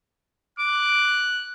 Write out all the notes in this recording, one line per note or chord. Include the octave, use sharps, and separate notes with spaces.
D6 F#6